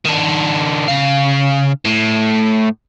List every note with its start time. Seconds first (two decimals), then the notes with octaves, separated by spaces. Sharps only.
0.05 D#3 D4
0.88 C#3 F5
1.85 A2